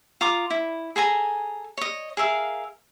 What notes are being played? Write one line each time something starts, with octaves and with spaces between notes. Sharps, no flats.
F4 A#5 D6 D#6
E4
G#4 A4 G#5 A#5
C#5 D#5
G#4 A#4 E5 F5